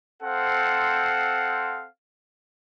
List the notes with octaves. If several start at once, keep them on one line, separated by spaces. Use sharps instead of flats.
C4 A4 C5 F5 F#5